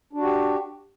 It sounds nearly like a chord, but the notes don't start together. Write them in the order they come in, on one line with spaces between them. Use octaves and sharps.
D4 F#4 G4